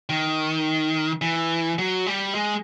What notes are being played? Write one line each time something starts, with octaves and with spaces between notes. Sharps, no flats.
D#3
E3
F#3
G3
G#3